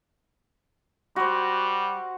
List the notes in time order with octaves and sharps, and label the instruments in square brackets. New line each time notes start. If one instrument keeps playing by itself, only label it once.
[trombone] G3 [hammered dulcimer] F#4 C5